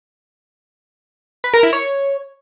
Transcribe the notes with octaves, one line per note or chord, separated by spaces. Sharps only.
B4
A#4
E4
C#5